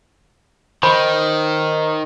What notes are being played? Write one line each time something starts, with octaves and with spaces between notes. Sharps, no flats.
D#3 C5 B5